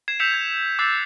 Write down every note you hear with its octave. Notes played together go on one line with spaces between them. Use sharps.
G#6 C7 E7
E6 G6 B6 C#7 E7 F7
G#6
D6 E6 F#6 G6 A6 C7